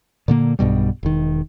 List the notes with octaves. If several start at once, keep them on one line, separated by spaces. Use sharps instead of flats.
A#2 D3 A#3
B1 G2 B2 G3
E1 D#3